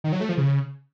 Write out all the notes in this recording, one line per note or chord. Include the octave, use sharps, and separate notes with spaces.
D#3
F#3
A3
F3
C#3